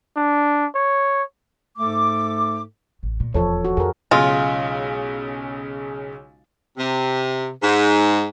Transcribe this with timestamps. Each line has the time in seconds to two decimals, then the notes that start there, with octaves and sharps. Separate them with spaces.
0.17 D4
0.75 C#5
1.77 G#2 A3 A4 D6
3.03 A1
3.20 A#2
3.34 D#1 E2 F3 A4 C#5
3.65 F#4
3.77 F2 G#4 A#4
4.11 B1 C#3 G#3 F4
6.77 C3
7.63 G#2